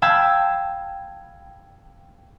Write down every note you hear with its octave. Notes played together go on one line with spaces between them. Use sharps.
F5 G5 A5 B5 E6 G#6